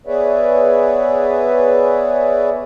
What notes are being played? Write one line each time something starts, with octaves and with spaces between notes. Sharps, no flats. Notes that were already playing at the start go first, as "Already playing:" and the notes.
B3 G#4 B4 C#5 D5 E5